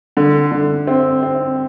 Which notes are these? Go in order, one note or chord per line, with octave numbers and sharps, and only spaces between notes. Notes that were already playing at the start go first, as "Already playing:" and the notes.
D3
D3
C4
C4